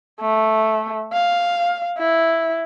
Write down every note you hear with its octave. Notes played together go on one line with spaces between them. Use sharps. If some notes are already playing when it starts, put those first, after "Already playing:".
A3
F5
E4